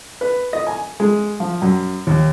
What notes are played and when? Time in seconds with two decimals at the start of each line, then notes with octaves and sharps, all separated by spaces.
0.21 B4
0.53 D#5
0.67 G#5
1.00 G#3
1.40 F3
1.62 F#2
2.07 D#2